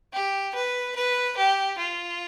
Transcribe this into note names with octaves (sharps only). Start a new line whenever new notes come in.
G4
B4
B4
G4
F4